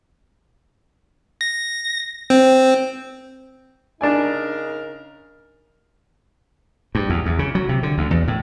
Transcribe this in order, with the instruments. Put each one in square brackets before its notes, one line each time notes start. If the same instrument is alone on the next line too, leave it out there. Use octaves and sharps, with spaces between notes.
[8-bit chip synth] A#6
C4
[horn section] C#3 D#4 A#4 [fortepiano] D4 D5 G#5
[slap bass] G2
E2
E2
C#3
F#3
C3
D3
D2
E2
A2